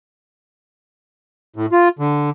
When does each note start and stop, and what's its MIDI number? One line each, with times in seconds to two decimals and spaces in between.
1.56 1.66 45
1.72 1.88 65
1.99 2.30 50